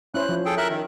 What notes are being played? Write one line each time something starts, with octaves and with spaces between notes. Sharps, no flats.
C#4 E4 C5 F#6
F3
G#4 A4 G5
A#4 E5 F#6
D#3